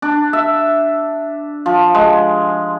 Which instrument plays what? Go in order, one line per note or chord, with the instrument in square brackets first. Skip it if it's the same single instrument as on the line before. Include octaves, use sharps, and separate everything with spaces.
[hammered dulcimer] D4
E5
F3
G#3